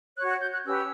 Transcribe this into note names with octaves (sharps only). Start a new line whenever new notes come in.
F#4 C#5 F#6
F#6
G6
F#6
C#4 G4 B4 E6